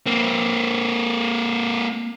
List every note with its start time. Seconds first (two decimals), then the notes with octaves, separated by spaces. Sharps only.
0.06 A#3 C4